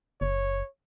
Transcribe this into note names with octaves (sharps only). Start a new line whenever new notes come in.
F#1 C#5